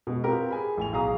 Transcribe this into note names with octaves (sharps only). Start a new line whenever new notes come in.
B2 G#3
C4 F4 G4 A#4 B4
G#4 G#5 B5
A1 G#5 F7
B1 G#4 F5 A#5 D#6